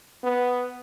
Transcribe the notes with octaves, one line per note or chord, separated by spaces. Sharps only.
B3